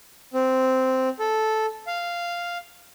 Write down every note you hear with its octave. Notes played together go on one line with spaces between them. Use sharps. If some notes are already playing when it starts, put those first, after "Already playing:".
C4
A4
F5